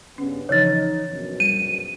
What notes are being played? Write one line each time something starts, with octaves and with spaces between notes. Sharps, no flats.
G2 C#3 B3 C#4
C#3 E3 F3 D#4 C#5 A6
A#1 F#2 B2
G3 D#7